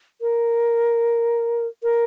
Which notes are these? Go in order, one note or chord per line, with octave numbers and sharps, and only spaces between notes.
A#4
A#4